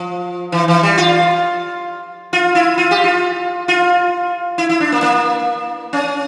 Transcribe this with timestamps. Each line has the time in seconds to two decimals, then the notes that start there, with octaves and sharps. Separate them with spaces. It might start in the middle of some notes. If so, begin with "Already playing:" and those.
Already playing: F3
0.52 E3
0.68 E3
0.83 G3
0.98 F4
2.33 F4
2.55 E4
2.78 F4
2.91 G4
3.04 F4
3.68 F4
4.58 E4
4.69 E4
4.80 D4
4.92 A#3
5.02 A#3
5.93 C#4